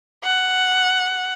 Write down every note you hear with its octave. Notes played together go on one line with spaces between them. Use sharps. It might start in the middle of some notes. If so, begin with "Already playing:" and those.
F#5